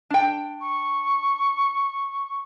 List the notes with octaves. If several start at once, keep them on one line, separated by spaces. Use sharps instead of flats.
D4 G5
C#6